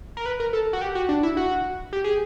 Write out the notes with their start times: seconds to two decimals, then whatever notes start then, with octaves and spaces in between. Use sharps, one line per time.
0.17 A#4
0.26 B4
0.40 A#4
0.53 A4
0.73 F#4
0.81 G4
0.95 F#4
1.09 D4
1.23 E4
1.37 F#4
1.93 G4
2.04 G#4